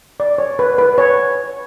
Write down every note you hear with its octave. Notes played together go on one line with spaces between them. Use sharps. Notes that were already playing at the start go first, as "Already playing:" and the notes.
D5
C#5
B4
B4
C#5